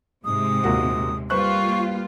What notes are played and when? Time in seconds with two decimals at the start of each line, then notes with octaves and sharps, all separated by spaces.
0.25 G#2 C3 G#3 D#6
0.64 D#2 A#2 A#3 F#4
1.30 G3 A#3 F4 B4 C5 C#6 F#6